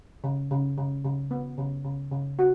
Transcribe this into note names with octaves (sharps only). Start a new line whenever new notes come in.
C#3
C#3
C#3
C#3
B3
C#3
C#3
C#3
F#4